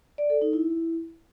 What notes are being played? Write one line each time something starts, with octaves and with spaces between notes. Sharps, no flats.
D5
A4
D#4
E4